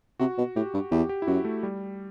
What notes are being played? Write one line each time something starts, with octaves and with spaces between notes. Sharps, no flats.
C3 F#4
B2
A2 G4
G2
E2 G4
G4
E4
F#2 F#4
A3
G3